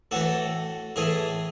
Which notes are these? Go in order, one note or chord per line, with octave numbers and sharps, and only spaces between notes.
A2 E3 A3 F#4 A4
A2 E3 A3 E4 G#4